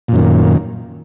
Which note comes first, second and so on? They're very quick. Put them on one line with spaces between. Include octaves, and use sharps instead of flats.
A#2 F#2 D#3